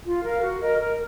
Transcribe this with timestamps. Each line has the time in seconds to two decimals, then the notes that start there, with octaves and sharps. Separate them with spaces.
0.04 F4
0.24 A#4 F5
0.41 F#4
0.60 A#4 D#5
0.78 A#4